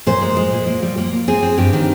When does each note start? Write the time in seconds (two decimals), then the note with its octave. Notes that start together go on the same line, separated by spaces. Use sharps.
0.07 A#2 C5
0.21 G#3
0.37 G#3
0.52 A#2
0.67 A#3
0.82 G3
0.97 A#3
1.13 A#3
1.27 C4 G#4
1.43 C4
1.57 G2 G4
1.73 D#3